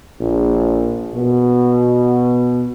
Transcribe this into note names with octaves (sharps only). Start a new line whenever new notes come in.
A#1
B2